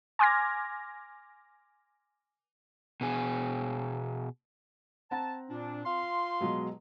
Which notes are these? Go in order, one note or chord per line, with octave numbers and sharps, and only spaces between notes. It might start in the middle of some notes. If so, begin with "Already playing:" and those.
G#5 C6 D6 F6 G#6 A#6
B2 G#4
C4 F#5 A5 A#5
A#2 D4
F4 F5 C6
B2 F#3 G#3